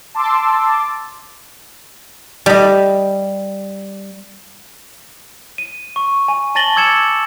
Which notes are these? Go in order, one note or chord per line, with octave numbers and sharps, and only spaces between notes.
A5 C6 D6 E6
G3 D#5
D#7
C#6
G#5
G#5 A5 A6 A#6 F#7 G7
D6 E6 G#6 C#7 E7